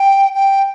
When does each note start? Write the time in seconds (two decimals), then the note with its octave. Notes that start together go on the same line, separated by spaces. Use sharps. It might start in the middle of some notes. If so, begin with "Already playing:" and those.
Already playing: G5
0.35 G5